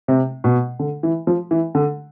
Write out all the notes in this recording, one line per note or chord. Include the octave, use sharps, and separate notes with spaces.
C3
B2
D3
E3
F3
E3
D3